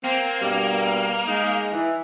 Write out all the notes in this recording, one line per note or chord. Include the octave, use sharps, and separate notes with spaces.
A#3 C4
G2 B2 G3
G#3 D#4
E3